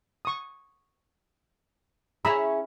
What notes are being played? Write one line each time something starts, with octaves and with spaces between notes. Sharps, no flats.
C#6 D#6
C#4 E4 G#4 A#5 B5 E6